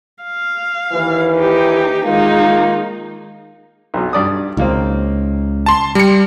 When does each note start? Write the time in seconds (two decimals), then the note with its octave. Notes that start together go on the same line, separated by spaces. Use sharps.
0.24 F5
0.92 D#2 E3
1.35 D#4 G4
2.05 D#3 G#3 A#3 D#4 F4
3.94 B1 B2
4.13 G2 D5 D#6
4.57 C#2 D#3 A#3 C4
5.66 A5 C6
5.95 G3 C#7